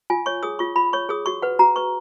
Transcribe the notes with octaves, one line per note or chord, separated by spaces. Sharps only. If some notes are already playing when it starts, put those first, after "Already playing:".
F4 G#5
C#5 C#6
G#4 D#6
F4 C#6
F4 B5
C#5 C#6
G#4 D#6
F#4 C#6
B4 F#5
F#4 A#5
B4 C#6